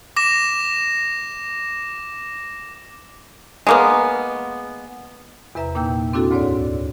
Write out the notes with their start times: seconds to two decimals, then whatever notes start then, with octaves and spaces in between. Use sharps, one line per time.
0.16 D6 A#6 E7
3.67 G#3 A#3 B3
5.55 E2 C3 B4 E5 A#5
5.75 A#2 A#3 D#4 G5 E6 G6
6.13 C4 D4 E4 F#4 A4
6.31 D2 G#2 C#5 D5